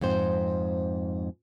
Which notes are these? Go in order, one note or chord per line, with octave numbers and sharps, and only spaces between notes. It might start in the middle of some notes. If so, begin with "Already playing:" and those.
F2 G#2 C4 C5